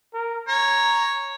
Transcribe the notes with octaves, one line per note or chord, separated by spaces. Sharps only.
A#4
C#5 A#5